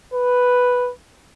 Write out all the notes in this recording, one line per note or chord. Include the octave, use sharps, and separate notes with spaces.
B4